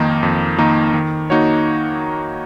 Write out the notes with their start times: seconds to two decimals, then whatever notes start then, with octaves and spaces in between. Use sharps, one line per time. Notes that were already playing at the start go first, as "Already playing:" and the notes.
Already playing: F2 D#3 A#3 D#4
0.23 F2
0.58 D#3 A#3 D#4
0.94 D#3
1.30 A#3 D#4 F#4 C#5